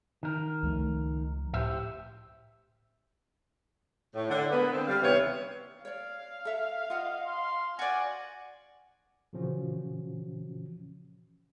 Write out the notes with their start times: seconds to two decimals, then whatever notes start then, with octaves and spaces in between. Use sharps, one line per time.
0.23 D#3 A#4
0.63 C#2 F3 A3
1.54 A2 G4 C5 E5
4.14 A2
4.29 D3
4.50 G#3 A#3 B3
4.72 D3 C4
4.87 G3 F5
5.02 D#2 C3 E3 B3 C#5
5.85 C#5 D5 F5
6.45 A4 E5
6.90 F4 D#5 F#5
7.25 C6
7.79 F#4 D5 G#5
9.33 A#2 C#3 E3 F3 C#4 F#4